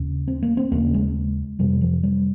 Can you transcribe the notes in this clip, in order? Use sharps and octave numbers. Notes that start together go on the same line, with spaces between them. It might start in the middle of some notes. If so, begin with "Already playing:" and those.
Already playing: D#2 C#3
C4
A#3
C4
D#2 C#3 A#3
G#3
F2 C3 G3
F3
G3